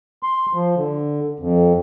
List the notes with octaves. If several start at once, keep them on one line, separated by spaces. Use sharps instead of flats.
C6
F3
D3
F2